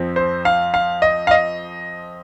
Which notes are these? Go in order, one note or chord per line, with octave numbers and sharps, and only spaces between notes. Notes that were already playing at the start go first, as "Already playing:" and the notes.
Already playing: F2 F3 C4
C5
F5
F5
D#5
F5
D#5